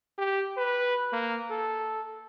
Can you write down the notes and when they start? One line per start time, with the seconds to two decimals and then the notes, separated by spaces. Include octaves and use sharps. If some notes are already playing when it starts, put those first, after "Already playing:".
0.18 G4
0.57 B4
1.13 A#3
1.51 A4